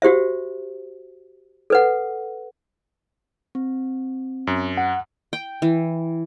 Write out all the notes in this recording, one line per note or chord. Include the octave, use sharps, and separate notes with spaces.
F#4 G4 C5 E5
A4 B4 F#5
C4
F#2
F#5
G5
E3